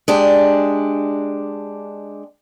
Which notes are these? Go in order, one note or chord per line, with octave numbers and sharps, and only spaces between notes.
G#3 D4 G4